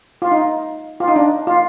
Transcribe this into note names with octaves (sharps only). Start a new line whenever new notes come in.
F4
D#4
F4
D#4
D4
F4